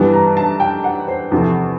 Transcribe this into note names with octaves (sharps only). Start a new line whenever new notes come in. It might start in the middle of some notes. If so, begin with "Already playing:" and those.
Already playing: G2 E3 G3 B3 A5
A#5
A5
G5
F#5
C5
E2 C3 F3 A3